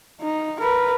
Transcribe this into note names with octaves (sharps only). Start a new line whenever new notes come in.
D#4
A#4 B4